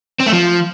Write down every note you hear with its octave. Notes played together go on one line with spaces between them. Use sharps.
C4
A3
F3